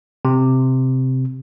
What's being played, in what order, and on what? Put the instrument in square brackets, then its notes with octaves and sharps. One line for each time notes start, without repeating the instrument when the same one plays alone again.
[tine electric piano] C3